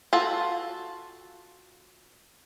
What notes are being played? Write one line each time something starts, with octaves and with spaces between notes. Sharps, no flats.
F4 F#4 A4 A5